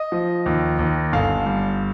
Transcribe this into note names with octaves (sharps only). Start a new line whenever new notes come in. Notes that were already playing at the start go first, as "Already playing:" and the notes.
Already playing: D#5
F3
D#2
D#2
G1 F5
G3